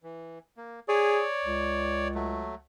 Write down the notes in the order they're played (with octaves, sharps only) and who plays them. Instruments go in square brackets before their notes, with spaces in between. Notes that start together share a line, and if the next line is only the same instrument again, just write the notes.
[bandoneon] E3
A#3
[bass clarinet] G#4 [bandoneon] C#5 D5
[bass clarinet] C#2
[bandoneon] F#3 A3